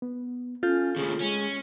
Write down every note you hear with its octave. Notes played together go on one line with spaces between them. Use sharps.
B3
C#4 F4 A4 G6 A6
D#2 C#3 G#4
G#3 C#4